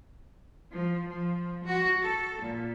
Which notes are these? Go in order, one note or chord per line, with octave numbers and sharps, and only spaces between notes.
F3
F3
F#4
A4
A#2